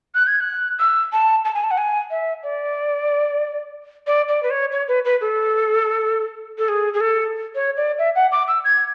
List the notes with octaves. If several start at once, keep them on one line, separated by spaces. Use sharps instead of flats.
F#6
G#6
F#6
E6
A5
A5
G#5
A5
F#5
G#5
E5
D5
D5
D5
B4
C#5
C#5
B4
B4
A4
A4
G#4
G#4
A4
C#5
D5
E5
F#5
D6
E6
G#6